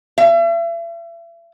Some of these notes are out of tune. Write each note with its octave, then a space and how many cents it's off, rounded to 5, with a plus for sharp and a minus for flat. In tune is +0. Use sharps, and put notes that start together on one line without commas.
E5 +40